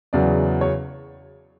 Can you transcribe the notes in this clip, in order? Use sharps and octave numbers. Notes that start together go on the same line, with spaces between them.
E2 C#3 F#3 D5
C#5